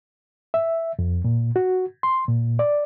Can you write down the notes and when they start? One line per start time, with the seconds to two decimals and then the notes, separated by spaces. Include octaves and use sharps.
0.54 E5
0.99 F2
1.24 A#2
1.56 F#4
2.03 C6
2.29 A#2
2.59 D5